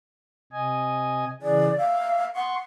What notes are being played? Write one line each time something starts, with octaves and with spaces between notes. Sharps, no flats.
C3 D#5 G#5
C#3 E3 G#4 D5
E5 F5
F#5 C6 C#6